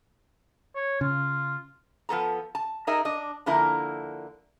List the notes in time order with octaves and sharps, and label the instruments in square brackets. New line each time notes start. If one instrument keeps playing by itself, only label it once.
[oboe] C#5
[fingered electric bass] C#3 [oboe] F4
[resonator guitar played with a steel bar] F3 B3 A4 A#5
A5
D#4 G#4 A#4 D#5 E5
D4 D#5
D3 F3 A#3 E4 A#4